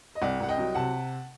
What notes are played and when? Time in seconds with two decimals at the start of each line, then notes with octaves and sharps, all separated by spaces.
0.15 D#5
0.22 C2 D5 F#5
0.40 C2 F#5
0.48 D#5 G5
0.58 F#3
0.75 C3 F#5 A5